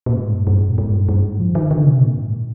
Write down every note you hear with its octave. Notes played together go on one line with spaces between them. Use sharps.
A#2
G#2
G2
G2
A#2
G#2
G2
G2
G#2
F3
D#3
D3
C3
A#2
G#2